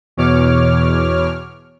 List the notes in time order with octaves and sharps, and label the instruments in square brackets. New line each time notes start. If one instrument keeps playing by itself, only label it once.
[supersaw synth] E2 B2 C#5 D6 F6